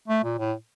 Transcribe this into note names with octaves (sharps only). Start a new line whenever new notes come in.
A3
A#2
A2